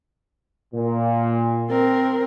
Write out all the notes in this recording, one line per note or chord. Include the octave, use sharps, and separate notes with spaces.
A#2
C4 A#4